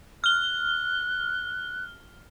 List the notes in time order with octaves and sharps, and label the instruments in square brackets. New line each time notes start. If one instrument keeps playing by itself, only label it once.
[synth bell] F6 G7 [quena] F#6